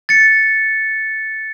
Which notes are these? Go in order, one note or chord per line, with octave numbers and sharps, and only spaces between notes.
A6 C#7